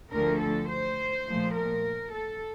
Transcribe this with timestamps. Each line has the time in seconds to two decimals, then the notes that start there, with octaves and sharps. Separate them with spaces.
0.11 D2 D3 F3 A3 A#4
0.40 A4
0.69 C5
1.26 A#2 F3 A3
1.55 A#4
2.13 A4